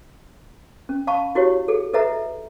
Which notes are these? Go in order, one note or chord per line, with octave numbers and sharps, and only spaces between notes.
C#4
F5 A5 B5 C#6
E4 F#4 G4 C#5
G#4 A4
A4 B4 D#5 E5 F#5 A#5